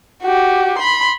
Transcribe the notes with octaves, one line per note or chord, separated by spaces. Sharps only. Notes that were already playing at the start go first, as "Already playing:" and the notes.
F#4 G4
B5 C6